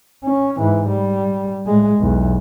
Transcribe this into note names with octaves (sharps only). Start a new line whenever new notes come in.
C#4
G#2 E3
G3
A2 G#3
B1 E2